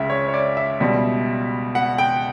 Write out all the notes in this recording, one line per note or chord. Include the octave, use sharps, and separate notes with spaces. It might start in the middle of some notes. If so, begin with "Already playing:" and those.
Already playing: C#2 C#3 E5
C#5
C#5
D5
E5
C#2 B2 G3
F#5
G5